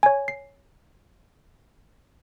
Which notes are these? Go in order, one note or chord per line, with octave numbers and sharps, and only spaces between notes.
C#5 G#5
C7